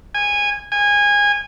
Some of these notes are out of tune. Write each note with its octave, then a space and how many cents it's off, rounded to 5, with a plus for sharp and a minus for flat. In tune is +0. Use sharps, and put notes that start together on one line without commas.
G#5 -15
G#5 -20